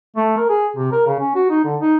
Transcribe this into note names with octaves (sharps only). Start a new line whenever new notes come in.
A3
A#4
G#4
C3
A#4
C#3
C#4
F#4
D#4
D3
D#4